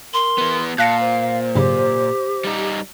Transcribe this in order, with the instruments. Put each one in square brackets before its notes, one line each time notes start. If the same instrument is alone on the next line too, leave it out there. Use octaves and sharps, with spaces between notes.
[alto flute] A#4 [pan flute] C6
[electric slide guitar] E3 B3
[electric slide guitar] A#2 [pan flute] F5 [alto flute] A5 [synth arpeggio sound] F#6 A#6 C#7
[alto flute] C5
[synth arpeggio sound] G#2 C#3 F#3 [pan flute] G4
[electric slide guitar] G3 D#4